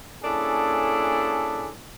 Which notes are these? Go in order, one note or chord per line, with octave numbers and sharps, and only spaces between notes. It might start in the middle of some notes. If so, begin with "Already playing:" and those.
A#3 C#4 D4 E4 G#4 A4